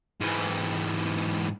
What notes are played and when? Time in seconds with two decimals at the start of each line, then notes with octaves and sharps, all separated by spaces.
0.21 G#2 E3